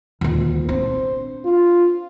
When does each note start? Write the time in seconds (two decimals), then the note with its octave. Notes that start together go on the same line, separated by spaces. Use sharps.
0.21 D#1 D2
0.69 C4 D4 C5
1.45 F4